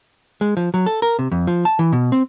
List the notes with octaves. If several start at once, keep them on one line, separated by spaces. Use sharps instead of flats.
G#3
F3
F#3
A4
A#4
C3
F2
F3
A5
E3
B2
C4